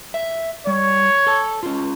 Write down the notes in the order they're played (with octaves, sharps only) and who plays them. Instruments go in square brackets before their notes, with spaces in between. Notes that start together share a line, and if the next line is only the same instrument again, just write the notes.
[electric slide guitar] E5
[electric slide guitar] G3 [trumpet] C#5
[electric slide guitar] A4 A5
C#4 F4